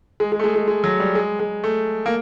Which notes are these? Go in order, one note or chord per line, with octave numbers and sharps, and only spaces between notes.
G#3
G#3
A3
G#3
G#3
G#3
F#3
G3
G#3
G#3
A3
A#3